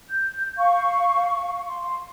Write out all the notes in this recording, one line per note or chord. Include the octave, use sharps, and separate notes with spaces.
G6
F5 C#6
C6